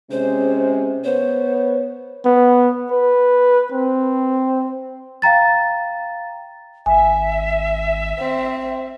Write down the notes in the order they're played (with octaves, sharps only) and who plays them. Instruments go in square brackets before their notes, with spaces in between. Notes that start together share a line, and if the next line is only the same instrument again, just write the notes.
[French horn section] C3 G#3 C#4 [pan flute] C5
[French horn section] B3 C#5 [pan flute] C5
[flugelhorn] B3
B4
C4
[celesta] F5 G5 A#5 A6
[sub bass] G#1 [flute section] E5 [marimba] G#5
[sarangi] C4